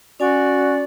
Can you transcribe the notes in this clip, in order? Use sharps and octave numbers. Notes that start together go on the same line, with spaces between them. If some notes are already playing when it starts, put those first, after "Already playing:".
C#4 F#4 D5 G#5